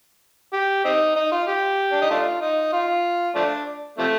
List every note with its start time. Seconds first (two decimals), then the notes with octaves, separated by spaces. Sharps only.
0.53 G4
0.85 C4 D#4
1.16 D#4
1.32 F4
1.48 G4
1.92 D4
2.01 D#4
2.11 A3 D4 F4
2.42 D#4
2.73 F4
3.35 F3 A3 D4
3.98 C3 F3 A3